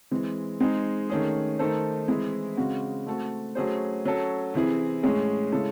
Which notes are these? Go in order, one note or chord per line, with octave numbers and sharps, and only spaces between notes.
E3 G#3 C4
G#3 C4 D#4 G#4
D#3 A3 C#4 G#4
D#3 A3 D#4 A4 C5
E3 G#3 C4 E4 G#4
C#3 G#3 C4 F#4
A3 C4 F#4 A4
F#3 A3 C#4 G#4 C5
F#3 C#4 F#4 A4
C3 E3 C4 E4 G#4
A2 G#3 C#4 G#4
C#3 G#3 C#4 E4 A4